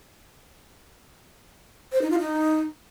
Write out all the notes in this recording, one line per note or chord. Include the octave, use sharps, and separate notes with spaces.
C5
D#4
F4
D#4